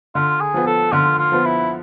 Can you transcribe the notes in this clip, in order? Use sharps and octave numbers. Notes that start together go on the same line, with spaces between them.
D3 F4
G#4
F3 B3
A4
D3 F4
F4
F3 B3
E4